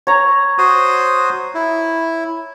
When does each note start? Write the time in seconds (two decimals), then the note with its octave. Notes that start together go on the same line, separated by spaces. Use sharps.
0.07 C#5 A#5
0.58 F#4 C5 D#6
1.55 E4